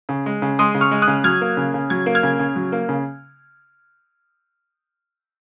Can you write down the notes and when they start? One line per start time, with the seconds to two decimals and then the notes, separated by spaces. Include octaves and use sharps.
0.09 C#3
0.26 G#3
0.42 C#3
0.59 G#3 C6 D#6
0.75 C#3
0.81 C#6 F6
0.91 G#3
1.02 D#6 F#6
1.08 C#3
1.24 F#3 F6 G#6
1.41 A#3
1.57 C#3
1.74 C#3
1.90 F#3 G#6
2.06 A#3
2.15 F6 G#6
2.23 C#3
2.39 C#3
2.56 F#3
2.72 A#3
2.89 C#3